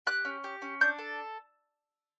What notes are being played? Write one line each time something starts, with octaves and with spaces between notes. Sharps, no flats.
G4 F#6
C#4
G4
C#4
D4 G6
A4